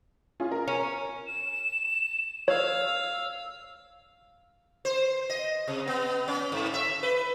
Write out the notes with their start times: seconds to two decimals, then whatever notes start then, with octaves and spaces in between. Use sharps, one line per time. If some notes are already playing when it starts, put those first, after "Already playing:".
0.40 C#4 F4 G#4
0.51 A#4
0.68 C#4
1.27 E7
2.48 C#5 F5 E6
4.85 C5
5.30 D#5
5.68 C3
5.88 B3
6.28 C#4
6.52 G#2
6.74 E5
7.03 B4